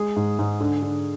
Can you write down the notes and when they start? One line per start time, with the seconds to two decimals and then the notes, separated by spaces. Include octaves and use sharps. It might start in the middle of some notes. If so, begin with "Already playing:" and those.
Already playing: G#3 G#4
0.16 G#2
0.39 G#2
0.60 D3
0.82 D3